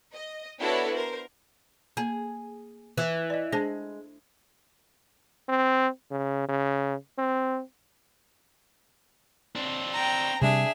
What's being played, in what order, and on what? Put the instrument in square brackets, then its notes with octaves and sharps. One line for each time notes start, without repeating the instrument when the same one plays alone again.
[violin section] D#5
B3 D4 E4 F#4 A4 C#5
A#4 C5
[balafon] A#3 [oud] G#4
[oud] E3
[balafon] D5 D#5
[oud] G#3 [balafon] D4 C5 A5
[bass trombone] C4
C#3
C#3
C4
[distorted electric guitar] C4 D4
[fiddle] G5 A#5
[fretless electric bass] C3 G3 [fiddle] D4 G#4 [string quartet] E5